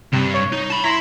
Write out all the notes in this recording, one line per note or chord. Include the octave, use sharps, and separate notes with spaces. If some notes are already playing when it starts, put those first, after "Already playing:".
G2 C3
C#5
D#4
A5 B5
E4 E5 A#5 C6